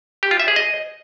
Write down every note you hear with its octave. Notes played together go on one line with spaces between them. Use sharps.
G4
F4
E5
G#4
D#5